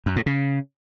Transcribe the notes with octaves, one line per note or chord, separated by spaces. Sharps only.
F#2
A2
C#3